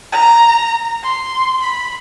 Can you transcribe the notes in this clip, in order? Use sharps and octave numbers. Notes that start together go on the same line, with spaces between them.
A#5
C6
B5